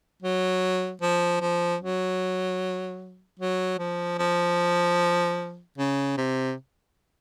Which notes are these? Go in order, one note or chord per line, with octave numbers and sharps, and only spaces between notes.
F#3
F3
F3
F#3
F#3
F3
F3
C#3
C3